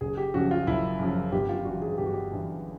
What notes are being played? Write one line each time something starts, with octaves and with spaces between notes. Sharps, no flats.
F#1 G#4
G4
F#2 C#3 F3 F#4
F4
F#1 E4
F#2 C#3 F3
G1 G4
F4
G2 E3 F#4
G#4
G1 G4
F#4
G4
G2 E3